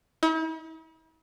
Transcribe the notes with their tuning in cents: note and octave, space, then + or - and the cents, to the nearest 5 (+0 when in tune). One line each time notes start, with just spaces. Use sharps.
E4 -45